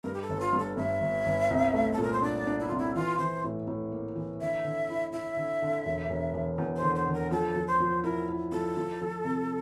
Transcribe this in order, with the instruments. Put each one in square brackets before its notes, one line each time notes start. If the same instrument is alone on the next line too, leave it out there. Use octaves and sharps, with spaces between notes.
[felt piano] G2 [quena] A#4
[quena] G4
A4
[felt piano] G1
[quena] F4
[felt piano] G2
[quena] A4
[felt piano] G2 [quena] E5
[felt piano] G1
G1
C2
A3
[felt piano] A#2 [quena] A4
[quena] A#4
C5
[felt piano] D4 [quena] D5
[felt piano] D4
[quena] E4
[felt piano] C2 [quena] F4
[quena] E4
[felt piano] E3 [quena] F4
[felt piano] E3 [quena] C5
[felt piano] A2
A2
A#3
E3
[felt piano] D3 [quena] E5
[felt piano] D3
E4
[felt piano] E4 [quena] E5
[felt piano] D3
D3
E1
E1
E1
E2
[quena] C5
[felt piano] D3
[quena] C5
[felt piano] D3
[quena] A#4
[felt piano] F3 [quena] A4
[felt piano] F3
[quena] C5
[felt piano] F3
[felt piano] E4 [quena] A#4
[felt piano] E4
[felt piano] F3 [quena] A4
[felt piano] F3
F3
C3